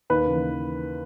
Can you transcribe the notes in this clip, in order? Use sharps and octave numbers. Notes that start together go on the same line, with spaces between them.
D#2 B4
C#3 E3